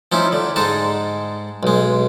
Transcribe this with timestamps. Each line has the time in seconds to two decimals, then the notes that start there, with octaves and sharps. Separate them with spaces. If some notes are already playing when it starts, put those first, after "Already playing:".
0.12 F3 C#4 D#4 E4
0.32 D3
0.56 G#2 G#3 D#4 A5
1.63 B1 G#3